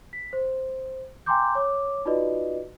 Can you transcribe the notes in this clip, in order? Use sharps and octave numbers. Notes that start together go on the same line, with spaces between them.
B6
C5
G5 G#5 A#5 C6 D6 G6
C#5 D6
D#4 F4 F#4 B4 D5 D#5